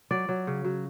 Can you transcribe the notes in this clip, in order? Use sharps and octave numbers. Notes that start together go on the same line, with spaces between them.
F#3 D5
F#3
C#3
F#3